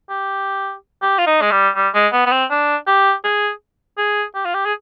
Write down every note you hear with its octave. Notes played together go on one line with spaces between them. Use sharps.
G4
G4
F4
D#4
G#3
G3
G3
G#3
B3
B3
C4
D4
G4
G#4
G#4
G4
F4
G4
G#4